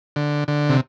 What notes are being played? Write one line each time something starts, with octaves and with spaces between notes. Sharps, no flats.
D3
D3
C3